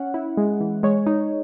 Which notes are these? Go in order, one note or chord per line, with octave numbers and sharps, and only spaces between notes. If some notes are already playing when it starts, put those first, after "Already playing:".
Already playing: C#4 F#5
E4
G#3
E3
G#3 C#5
D#4